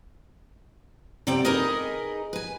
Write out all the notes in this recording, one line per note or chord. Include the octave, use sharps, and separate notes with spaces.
C3 G3 B3 D5 G5
D#4 G#4 A#4 B4 D#5
B4 G#5